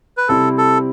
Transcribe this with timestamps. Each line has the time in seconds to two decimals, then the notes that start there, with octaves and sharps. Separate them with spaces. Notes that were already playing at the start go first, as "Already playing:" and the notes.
0.17 B4
0.29 C3 G3 C4 E4 A4
0.58 A4